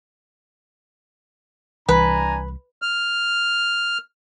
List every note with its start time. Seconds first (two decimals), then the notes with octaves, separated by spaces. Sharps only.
1.89 C2 E3 D4 B4 G#5 A#5
2.82 F6